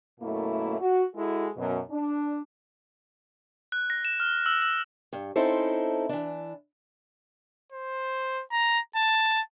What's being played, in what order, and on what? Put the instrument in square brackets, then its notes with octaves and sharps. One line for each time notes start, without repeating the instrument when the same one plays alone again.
[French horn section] F#2 B2 A3 A#3 E4
F#4
G#3 E4 F#4 G#4 A4
F#2 B2
D4
[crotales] F#6
A#6
E7
F6
E6
E6
[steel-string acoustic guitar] G2
C4 C#4 D#4 E4 A4 C5
E3 D4
[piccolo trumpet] C5
A#5
A5